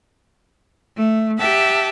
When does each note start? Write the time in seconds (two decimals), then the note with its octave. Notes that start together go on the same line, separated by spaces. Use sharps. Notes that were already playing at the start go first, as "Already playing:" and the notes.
0.97 A3
1.39 G4 E5 F#5 A5